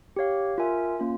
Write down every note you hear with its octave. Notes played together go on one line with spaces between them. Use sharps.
G4 C#5 F5
F4 A#4 E5 G#5
A#3 C#4 F4